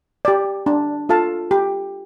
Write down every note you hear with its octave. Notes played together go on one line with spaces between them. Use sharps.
G4 D5
D4
F4 A4 F5 A5
G4